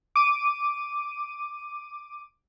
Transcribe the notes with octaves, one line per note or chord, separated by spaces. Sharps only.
D6 D#7